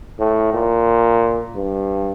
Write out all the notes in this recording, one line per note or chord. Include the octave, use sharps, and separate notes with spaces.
A2
A#2
G2